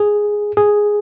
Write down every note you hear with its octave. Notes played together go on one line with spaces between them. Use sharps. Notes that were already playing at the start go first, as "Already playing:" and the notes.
Already playing: G#4
G#4